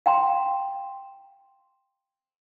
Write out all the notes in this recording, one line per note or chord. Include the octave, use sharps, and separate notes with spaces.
F5 G5 A#5 C6